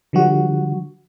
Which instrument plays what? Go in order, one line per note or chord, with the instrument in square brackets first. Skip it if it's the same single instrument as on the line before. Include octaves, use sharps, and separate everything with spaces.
[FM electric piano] D3 F3 G3 F#4